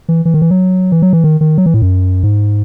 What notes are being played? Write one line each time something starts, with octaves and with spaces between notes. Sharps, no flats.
E3
E3
D#3
E3
F#3
E3
F#3
E3
D#3
D#3
F#3
E3
A2
F#2
G#2